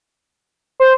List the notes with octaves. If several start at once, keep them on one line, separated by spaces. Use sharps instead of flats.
C5